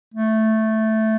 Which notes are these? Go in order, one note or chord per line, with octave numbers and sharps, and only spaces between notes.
A3